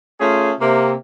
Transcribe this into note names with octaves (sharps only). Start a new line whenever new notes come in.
A3 C#4 F4 G#4
C3 A#3